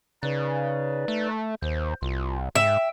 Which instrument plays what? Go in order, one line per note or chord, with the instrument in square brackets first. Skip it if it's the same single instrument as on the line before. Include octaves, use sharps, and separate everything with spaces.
[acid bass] C#3 [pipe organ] D#4 B4 D5
[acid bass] A3
[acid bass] D#2 [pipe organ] C5
[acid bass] C2 [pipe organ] F4
[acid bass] G#2 [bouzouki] E5 [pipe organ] G5